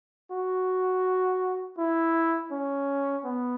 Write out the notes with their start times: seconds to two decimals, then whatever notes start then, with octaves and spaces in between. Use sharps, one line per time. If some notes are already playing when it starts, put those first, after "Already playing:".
0.31 F#4
1.78 E4
2.52 C#4
3.25 B3